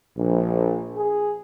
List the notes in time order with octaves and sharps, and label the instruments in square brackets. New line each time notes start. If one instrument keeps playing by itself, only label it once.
[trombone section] A#1
G#4